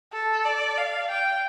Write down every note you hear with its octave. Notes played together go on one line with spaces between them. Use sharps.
A4
D5
F5
G5